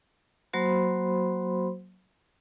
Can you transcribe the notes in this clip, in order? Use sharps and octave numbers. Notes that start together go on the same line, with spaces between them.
F#3 A#3 F#4 C5 B5 C6